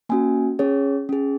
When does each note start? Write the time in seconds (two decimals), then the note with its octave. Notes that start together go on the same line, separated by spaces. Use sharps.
0.09 A#3 C#4 F#4 G#5
0.59 C#4 G#4 C#5
1.09 C#4 G#4